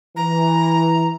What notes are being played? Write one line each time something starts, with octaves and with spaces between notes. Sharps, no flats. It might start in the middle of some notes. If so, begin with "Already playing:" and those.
E3 A#5